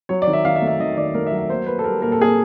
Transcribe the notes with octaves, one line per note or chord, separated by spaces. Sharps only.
F#3 C#5
D5
D#3
E5
D#3 F5
E5
A3
E5
D#3 D#5
D#3 D5
A3 A#4
E5
F#3
E5
A#3 C5
A#3 B4
A4
G3 A#4
A#2 A#4
A4
A#3 G#4